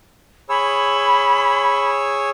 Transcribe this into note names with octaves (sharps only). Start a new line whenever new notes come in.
G#4 C#5 B5 E6